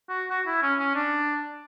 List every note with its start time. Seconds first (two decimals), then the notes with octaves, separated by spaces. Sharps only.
0.09 F#4
0.30 F#4
0.46 E4
0.62 C#4
0.79 C#4
0.95 D4